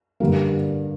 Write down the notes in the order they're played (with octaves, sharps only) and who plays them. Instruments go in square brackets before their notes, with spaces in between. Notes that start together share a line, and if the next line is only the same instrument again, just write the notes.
[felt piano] G2 D3 G3 A#3